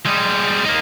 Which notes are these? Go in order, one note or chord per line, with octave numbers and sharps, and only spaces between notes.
G3 G#3
A#3 D#4